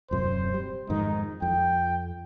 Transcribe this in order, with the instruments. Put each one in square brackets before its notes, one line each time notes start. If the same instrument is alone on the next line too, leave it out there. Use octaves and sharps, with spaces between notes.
[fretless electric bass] D#1 F#2 C3 [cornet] C5
[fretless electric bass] G3
[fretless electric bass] F2 G#2 D#3 [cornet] D#4
[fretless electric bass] F2 [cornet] G5